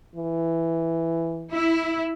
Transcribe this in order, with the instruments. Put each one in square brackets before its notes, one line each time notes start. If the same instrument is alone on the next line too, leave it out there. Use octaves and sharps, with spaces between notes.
[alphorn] E3
[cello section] E4